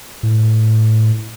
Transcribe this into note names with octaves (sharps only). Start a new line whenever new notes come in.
A2